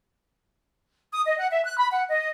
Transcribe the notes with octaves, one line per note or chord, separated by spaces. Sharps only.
D#6
D#5
F#5
E5
F#6
B5
F#5
D#5